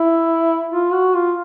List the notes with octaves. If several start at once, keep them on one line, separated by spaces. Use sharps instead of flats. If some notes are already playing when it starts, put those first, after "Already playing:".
Already playing: E4
F4
F#4
F4